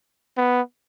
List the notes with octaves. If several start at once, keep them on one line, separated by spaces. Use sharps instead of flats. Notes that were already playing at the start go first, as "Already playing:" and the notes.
B3